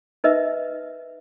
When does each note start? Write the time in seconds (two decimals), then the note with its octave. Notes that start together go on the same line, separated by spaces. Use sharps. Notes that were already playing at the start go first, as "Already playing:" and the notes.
0.24 D#4 A#4 B4 D#5 E5